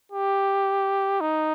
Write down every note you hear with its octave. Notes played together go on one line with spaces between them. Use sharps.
G4
D#4